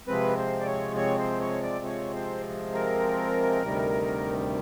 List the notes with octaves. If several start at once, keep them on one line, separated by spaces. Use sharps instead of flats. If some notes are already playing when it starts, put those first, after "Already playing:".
C3 F3 G#3 C4 B4
C5
D5
C#5
C#5
C5
C#5
D5
C#5
C5
A#4
D2 C3 D#3 G3